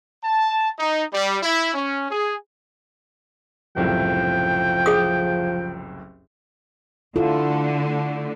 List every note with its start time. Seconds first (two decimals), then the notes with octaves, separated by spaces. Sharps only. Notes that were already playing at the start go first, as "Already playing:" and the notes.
0.24 A5
0.79 D#4
1.13 G3
1.42 E4
1.74 C#4
2.10 G#4
3.76 F#1 C2 A2 F3 G5
4.86 G#4 D#6
7.16 D3 A3 E4 F4 A4